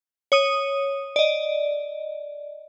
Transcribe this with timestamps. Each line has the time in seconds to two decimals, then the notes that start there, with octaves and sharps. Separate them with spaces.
0.32 C#5 D#6 D#7
1.16 D5 D#5